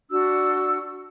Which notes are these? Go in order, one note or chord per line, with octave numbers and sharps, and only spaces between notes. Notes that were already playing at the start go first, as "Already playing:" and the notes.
D4 F#4 E6